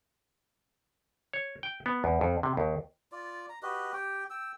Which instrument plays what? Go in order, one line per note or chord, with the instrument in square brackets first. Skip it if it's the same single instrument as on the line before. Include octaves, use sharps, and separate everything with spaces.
[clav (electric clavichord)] C#5
G5
B3
E2
F2
C3
D#2
[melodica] F4 D5
A#5
F#4 G4 B4 D#5
G4 G5
G5 E6